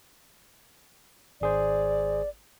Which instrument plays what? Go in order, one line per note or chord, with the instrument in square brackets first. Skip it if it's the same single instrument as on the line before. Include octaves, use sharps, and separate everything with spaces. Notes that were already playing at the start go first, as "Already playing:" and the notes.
[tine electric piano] G#1 G#4 C5 [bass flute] D5